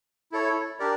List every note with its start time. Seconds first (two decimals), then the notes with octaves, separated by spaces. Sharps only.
0.32 E4 A4 C#5
0.79 D4 G4 A#4 D5